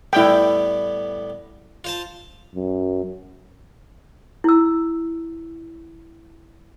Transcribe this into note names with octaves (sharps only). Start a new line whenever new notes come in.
A2 G3 B3 E4 G5
F4 C5 A5
F#2
E4 E6